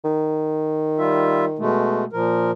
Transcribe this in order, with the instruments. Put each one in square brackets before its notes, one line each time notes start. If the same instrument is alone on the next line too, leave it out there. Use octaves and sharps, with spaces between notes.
[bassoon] D#3
[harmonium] G3 F4 E5
B2 G#3 A3
A#2 F3 A#4